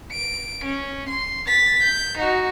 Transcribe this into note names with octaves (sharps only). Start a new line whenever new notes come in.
D7
C#4
C6
A6 B6
G6
D#4 F#4